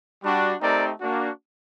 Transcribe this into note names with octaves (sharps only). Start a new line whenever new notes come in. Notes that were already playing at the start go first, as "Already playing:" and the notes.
G3 D4 F#4
A3 C4 D#4 G4 A#4 D5
A#3 D4 F#4